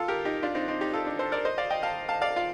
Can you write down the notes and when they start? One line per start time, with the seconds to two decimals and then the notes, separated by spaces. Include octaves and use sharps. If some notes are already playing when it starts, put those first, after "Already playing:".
Already playing: F4 A4
0.08 G4 A#4
0.25 D#4 G4
0.43 D4 F4
0.55 C4 D#4
0.68 C4 D#4
0.81 D#4 G4
0.93 F4 A4
1.06 D4
1.19 A4 C5
1.32 A#4 D5
1.45 C5 D#5
1.58 D5 F5
1.70 D#5 G5
1.83 F5 A5
2.09 F5 A5
2.22 D5 F5
2.36 F4